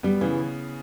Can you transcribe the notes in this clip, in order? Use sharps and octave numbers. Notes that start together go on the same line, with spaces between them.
G3 B3
C#3 E3